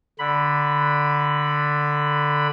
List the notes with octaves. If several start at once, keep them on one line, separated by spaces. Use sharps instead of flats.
D3 B5